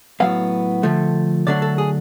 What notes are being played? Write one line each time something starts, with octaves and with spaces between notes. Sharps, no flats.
A2 F#3 B3 F5
D3 F3 A3
D3 F#3 A3 D4 D5
A4
G#4